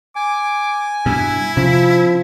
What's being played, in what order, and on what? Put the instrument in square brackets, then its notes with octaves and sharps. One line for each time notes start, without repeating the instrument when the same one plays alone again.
[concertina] G#5 [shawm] D6
[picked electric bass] G2 B2 [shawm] E4
[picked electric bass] C3 C#4 [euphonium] F3